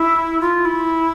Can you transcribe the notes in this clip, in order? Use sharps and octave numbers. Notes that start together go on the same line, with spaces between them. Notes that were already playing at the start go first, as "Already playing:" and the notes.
Already playing: E4
F4
E4